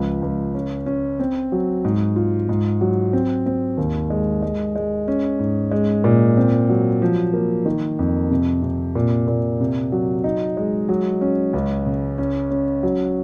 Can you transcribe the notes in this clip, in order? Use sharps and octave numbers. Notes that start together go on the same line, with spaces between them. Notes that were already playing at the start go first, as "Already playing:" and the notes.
Already playing: C#2 F3
C#2
C#4
C#4
C4
F#3
G#2
F4
G#2
F#3
C4
C4
D#2
G#3
G#3
G#3
C#4
G#2
G#3
A#2
C4
F#3
F3
A#3
D#3
F2
C3
C3
A#2
A#2
C3
F#3
D#4
G#3
F#3
C#4
C#2
C#3
C#4
C#4
F#3